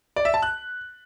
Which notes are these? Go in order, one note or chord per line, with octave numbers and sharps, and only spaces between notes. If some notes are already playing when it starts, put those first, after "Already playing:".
D5
E5
A5
F#6